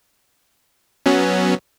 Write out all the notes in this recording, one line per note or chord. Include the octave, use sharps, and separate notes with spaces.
F#3 B3 C#4